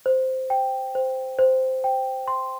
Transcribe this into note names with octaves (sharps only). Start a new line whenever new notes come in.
C5
G5
C5
C5
G5
C6